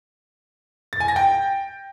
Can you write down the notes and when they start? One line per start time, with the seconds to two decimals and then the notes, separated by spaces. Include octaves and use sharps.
0.93 A6
1.00 G#5
1.08 A#6
1.16 G5